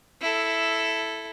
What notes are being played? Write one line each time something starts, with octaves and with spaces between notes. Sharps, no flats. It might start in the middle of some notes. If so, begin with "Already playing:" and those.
E4 A4